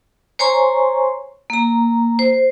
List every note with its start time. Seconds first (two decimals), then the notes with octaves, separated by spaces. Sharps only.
0.39 C5 C#5 G#5 A#5 C6 C#6
1.50 A#3 A#5
2.19 C5